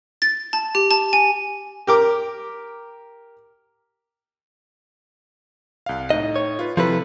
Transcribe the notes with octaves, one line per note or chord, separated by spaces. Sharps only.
A6
A5
G4
A5
G#5
G4 A#4 D6
C2 F5
A2 D#4 D#5
C#5
F4 B4
C3 F3 E4 F4 A4 B4